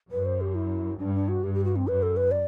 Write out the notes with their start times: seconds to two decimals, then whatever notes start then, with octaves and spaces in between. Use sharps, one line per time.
0.12 F#2 B4
0.25 C5
0.41 G4
0.55 E4
0.99 G2 D4
1.14 D4
1.29 F#4
1.43 G2 G4
1.54 G4
1.65 F#4
1.76 C4
1.88 F#2 B4
2.03 A4
2.17 B4
2.31 D5